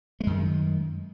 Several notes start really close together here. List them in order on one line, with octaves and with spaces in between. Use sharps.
A3 G#3 F#2 D#3